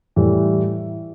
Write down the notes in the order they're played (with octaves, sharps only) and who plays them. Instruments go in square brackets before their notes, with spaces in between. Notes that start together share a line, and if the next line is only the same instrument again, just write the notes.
[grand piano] A2 E3 G3